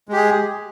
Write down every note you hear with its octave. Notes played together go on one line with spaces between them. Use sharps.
G#3 G4 G#4